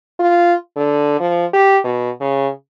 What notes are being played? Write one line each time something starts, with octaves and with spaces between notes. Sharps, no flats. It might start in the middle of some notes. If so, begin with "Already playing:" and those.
F4
D3
F3
G4
B2
C#3